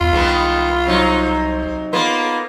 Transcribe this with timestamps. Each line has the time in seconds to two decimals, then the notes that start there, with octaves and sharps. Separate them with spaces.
0.01 E2 F4
0.13 C2 D#3 G#3 B3
0.86 C3 F#3 D#4
1.93 A#3 B3 F4